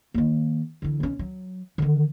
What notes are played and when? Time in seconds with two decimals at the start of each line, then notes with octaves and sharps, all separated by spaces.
0.14 D#3 A#3
0.82 D3 E3
1.00 B1 C#4
1.19 F#3
1.78 D3 D#3